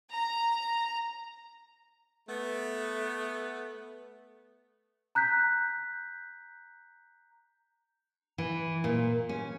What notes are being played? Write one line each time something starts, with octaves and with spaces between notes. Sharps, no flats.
A#5
A3 B3
A#5 F#6 G6 B6
E3
A#2
C#4